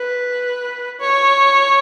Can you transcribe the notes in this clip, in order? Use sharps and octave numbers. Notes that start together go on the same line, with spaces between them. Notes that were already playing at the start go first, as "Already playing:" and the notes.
Already playing: B4
C#5